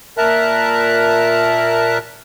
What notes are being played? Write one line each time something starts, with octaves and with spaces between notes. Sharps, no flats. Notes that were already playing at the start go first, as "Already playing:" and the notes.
A#2 A#4 E5 A5 A#5 F#6